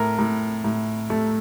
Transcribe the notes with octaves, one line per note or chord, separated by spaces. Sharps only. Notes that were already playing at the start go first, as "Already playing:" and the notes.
Already playing: A2 A#4
A2
A2
A3